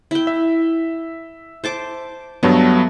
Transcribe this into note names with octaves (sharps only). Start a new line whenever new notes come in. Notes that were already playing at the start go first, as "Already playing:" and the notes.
E4 G5
E5
C5 A5 D6
G2 F#3 A3 B3